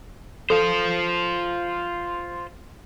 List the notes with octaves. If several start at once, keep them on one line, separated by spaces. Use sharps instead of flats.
F4 A4 C5